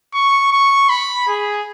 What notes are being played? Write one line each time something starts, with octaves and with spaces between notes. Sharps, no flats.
C#6
C#6
B5
G#4